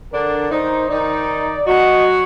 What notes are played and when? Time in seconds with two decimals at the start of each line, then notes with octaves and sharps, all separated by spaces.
0.12 D3 D4 A#4
0.51 D#3 D#4 C5
0.89 D#3 D#4 D5
1.66 F#3 F#4 D#5